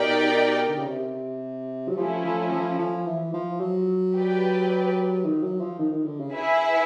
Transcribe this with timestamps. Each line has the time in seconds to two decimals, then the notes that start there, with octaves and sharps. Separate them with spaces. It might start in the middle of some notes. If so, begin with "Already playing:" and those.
Already playing: B2 D#4 G4 A#4 D5 G5
0.68 D3
0.78 C#3
0.88 C3
1.89 F#3
1.97 F3 A3 C#4 E4
2.25 F3
2.52 F3
2.79 F3
3.06 E3
3.34 F3
3.60 F#3
4.15 G4 B4 D5
5.25 D#3
5.42 F#3
5.61 F3
5.79 D#3
5.93 D#3
6.06 D3
6.20 C#3
6.34 E4 G#4 B4 E5